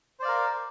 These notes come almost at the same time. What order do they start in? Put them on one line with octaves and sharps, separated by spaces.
C5 D5 F5 A#4